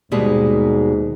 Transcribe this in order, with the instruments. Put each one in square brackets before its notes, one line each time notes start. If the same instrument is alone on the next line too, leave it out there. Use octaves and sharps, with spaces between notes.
[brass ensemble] D#2 G#2 [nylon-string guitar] B2 G3 G#3